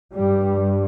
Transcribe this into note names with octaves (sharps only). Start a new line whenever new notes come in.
G2 G3